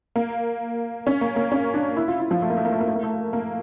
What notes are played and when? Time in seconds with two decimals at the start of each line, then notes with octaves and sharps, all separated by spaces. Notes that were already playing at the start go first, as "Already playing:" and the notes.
0.16 A#3
1.07 C#4
1.21 A#3
1.36 A#3
1.52 C#4
1.74 D4
1.97 E4
2.08 F4
2.20 E4
2.31 F3
2.42 A3
2.50 A#3
2.57 A3
2.65 A#3
2.72 A3
2.80 A#3
2.88 A3
2.95 A#3
3.03 A3
3.33 A#3